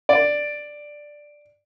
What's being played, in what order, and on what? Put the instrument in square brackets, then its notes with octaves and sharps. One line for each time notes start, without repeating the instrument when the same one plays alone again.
[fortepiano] D5